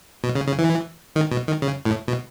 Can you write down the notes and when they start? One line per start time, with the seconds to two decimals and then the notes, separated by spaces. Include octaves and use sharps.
0.24 B2
0.35 C#3
0.47 C#3
0.59 E3
1.16 D#3
1.32 B2
1.47 D#3
1.62 C#3
1.85 A2
2.08 B2